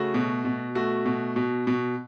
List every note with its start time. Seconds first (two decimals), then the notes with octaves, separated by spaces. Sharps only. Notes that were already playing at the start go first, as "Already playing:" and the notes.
Already playing: C#3 A3 F#4
0.14 B2
0.45 B2
0.75 A3 F#4
1.06 B2
1.36 B2
1.67 B2